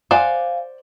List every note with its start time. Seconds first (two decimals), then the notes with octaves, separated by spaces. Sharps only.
0.11 C5 D5 F5 F#5 G#5